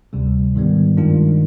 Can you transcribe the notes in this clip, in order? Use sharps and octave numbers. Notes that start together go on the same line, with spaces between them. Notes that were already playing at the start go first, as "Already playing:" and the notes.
D2 C3 G3
G#2 D#3 G3 B3
G2 D#3 G#3 D4 F4